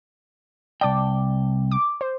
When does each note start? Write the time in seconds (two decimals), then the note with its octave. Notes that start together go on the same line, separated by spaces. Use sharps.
0.81 C2 D5 G5 A5 D6
1.71 D6
2.01 C5